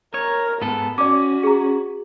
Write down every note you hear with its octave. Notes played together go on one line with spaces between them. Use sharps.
A#4 C#5
G#2 B3 A4
C#4 F#4 D5 D6
G#4 A#5